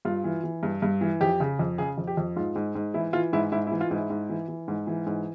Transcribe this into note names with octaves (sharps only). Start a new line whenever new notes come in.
G2 F4
E3
E3
G2
G2
E3
F2 G4
C#3
F2
C#3 G#4
F2
G4
F2
G#2 F4
G#2
G#2
E3 E4
E3 F4
G#2 E4
G#2 E4
E4
E3
F4
G#2 E4
G#2
E3
E3
G#2
E3
G#2